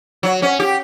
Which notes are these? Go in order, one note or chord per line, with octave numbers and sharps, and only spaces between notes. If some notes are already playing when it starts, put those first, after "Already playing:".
F#3
C#4
G4